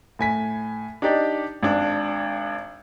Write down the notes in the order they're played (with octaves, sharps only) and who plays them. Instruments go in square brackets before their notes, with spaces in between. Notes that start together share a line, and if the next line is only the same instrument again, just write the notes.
[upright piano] A2 G#5 B6
D4 D#4 G4 D5
G#1 D4